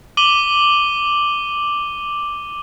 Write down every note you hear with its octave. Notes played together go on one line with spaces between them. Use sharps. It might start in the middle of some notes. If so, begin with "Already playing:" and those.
D6 D#7 F#7 G7